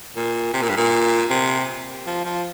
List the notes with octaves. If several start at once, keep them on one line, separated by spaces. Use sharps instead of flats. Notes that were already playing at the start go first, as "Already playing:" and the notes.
A#2
C3
A#2
G2
A#2
C3
F3
F3